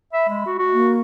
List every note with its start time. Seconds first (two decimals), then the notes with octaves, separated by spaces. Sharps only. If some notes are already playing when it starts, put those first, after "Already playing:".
0.13 E5 B5
0.29 G#3
0.46 F#4
0.59 F#4
0.73 A#3